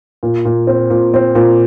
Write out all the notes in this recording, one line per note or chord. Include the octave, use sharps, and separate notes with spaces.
A#2
A#2
C4
A#2
C4
A#2